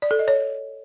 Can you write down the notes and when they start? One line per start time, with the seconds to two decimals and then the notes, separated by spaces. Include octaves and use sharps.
0.02 D5
0.11 A4
0.19 D#5
0.28 C#5